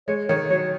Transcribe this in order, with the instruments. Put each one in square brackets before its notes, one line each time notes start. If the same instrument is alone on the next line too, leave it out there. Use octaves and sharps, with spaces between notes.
[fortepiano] G#3 [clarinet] C#5
[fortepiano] D#3 [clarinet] C#5
[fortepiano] F#3 [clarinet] C#5